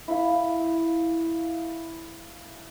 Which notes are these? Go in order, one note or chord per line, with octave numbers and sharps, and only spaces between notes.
E4 F5